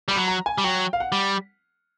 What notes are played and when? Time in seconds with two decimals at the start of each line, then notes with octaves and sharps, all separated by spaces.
0.08 G3 B5
0.16 F#3
0.28 A#5
0.46 G#5
0.58 G3
0.64 F#3 G5
0.93 F5
1.00 F#5
1.12 G3